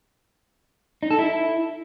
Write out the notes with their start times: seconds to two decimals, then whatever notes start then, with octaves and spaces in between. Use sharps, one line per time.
1.03 D#4
1.11 A4
1.19 E4